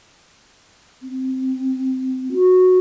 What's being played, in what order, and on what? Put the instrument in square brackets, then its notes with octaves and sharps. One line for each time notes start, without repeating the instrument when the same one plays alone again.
[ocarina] C4
F#4